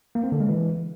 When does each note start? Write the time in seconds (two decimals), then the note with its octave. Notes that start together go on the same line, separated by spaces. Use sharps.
0.15 A#3
0.24 C4
0.32 D3
0.40 G#3
0.49 E3